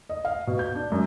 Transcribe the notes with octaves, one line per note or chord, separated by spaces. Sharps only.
D#5
F5
B2
G6
D4
F#2